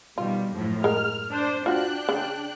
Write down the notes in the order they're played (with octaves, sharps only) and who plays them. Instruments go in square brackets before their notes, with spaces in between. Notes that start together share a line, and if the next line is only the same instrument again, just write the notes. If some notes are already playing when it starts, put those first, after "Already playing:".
[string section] B2 D#3 G3 [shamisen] F4
[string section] F#2 A2 F3
[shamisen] G#3 A#4 [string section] F6
[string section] D4 C5
[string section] D4 G5 F#6 [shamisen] F4 F#4
[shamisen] C#3